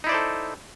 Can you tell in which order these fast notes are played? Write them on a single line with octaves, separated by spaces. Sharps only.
D#4 E4 D5 C5 A4